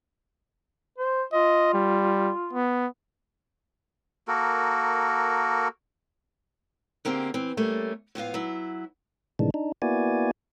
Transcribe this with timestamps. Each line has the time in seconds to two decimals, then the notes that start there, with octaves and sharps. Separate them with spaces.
0.98 C5
1.33 F4 D#5
1.74 G3
2.53 B3
4.28 A#3 F#4 A4 A#4
7.05 D3 A#3 C4 G4 G#4
7.34 E3 C4
7.57 G3 A3 A#3 C#4
8.15 A2 F3 B3 F5
8.34 F#3 E4
9.39 A2 C3 D#3 E3 G#3 D4
9.54 D4 D#4
9.82 A#3 B3 E4 F#4 D5 G#5